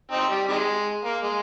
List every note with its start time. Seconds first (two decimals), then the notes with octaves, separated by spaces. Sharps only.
0.12 C4 D#4
0.31 G3
0.49 C3 D#3 G#3
1.05 A#3
1.23 G#3